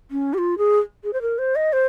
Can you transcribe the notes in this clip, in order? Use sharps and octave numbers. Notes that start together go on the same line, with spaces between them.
C#4
G4
F4
G#4
G#4
C5
A#4
C5
D#5
C5